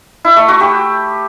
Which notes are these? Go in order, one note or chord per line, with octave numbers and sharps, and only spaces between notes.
E4
A3
F#4
G4